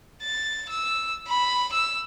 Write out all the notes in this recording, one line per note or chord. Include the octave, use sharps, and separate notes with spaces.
A6
E6
B5
E6